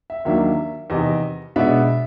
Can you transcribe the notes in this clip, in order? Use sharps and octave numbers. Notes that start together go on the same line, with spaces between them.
E5
D#2 D#3 F#3 A#3 D4 E5
E2 C3 D#3 D#5
B2 G#3 B3 D4 E5